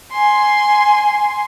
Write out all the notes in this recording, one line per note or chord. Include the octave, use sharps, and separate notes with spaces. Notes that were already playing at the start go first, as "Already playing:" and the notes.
G#5 C6